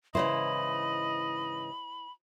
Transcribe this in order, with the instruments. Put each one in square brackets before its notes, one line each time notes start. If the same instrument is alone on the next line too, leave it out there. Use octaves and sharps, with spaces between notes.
[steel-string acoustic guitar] G#2 C#3 E3 [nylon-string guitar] E4 C5 [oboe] D#5 [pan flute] B5